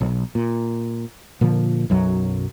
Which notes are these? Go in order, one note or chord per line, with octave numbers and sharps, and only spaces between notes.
B1
A#2
A#2 D3 F3 A#3
B1 F#2 F#3